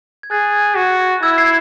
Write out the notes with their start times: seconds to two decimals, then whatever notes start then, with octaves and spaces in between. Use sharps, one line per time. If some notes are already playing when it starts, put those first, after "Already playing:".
0.23 G#6
0.31 G#4 F#6 A6
0.76 F#4
1.23 E4 E6 G#6
1.38 G#6 C7